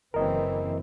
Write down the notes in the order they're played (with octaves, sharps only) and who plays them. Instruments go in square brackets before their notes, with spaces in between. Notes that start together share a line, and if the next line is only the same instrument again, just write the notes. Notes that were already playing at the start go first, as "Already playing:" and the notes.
[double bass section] F#1 E3 C4 [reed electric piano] A#4 D#5